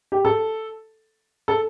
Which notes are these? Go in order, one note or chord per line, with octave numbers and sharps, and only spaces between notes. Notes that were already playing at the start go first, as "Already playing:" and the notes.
G4
A4
A4